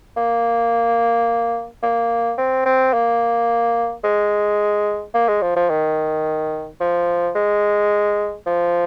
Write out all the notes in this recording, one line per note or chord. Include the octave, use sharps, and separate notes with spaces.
A#3
A#3
C4
C4
A#3
G#3
A#3
G#3
F3
F3
D#3
F3
G#3
F3